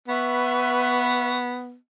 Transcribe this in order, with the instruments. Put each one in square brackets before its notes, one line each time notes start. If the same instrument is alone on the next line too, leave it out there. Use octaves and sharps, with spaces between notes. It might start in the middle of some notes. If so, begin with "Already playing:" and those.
[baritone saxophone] B3 [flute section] B4 E5 C#6